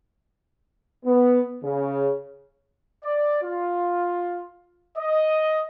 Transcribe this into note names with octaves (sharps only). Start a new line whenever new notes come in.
B3
C#3
D5
F4
D#5